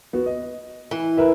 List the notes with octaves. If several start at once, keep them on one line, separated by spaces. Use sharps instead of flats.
B3 F#4
D#5
E3
A#4 B4 E5